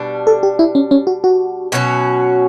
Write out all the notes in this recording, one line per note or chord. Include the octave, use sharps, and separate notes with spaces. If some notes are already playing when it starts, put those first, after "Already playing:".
Already playing: B2 G3 D4
A4
G4
E4
C#4
C#4
F#4
F#4
B2 F#3 C#4 F#4